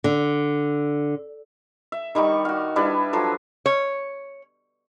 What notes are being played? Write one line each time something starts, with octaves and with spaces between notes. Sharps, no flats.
D3
E5
D#3 G3 D#4 C#6
F#4 F5
G3 D4 E4 B4
F3 F#3 A4
C#5